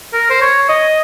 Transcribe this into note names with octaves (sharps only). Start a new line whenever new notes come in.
A#4
C5
C#5
D#5